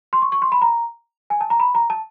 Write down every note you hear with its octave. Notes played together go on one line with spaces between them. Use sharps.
C6
C#6
C#6
C6
B5
A#5
G#5
A5
A#5
B5
A#5
A5